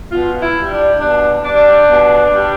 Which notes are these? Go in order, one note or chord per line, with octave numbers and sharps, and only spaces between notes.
B2 F4
E4
G3
D4
B2 D4
G3 D4
B2
G3